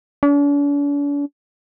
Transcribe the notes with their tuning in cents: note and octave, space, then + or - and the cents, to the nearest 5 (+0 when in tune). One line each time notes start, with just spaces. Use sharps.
D4 -45